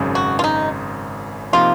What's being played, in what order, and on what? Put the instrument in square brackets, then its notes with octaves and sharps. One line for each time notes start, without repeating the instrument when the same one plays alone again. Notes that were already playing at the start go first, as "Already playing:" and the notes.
Already playing: [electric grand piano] G#1 F#2 C#3
[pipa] F#4
F4
D#4
[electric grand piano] C3 F3 A#3 D#4 [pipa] F4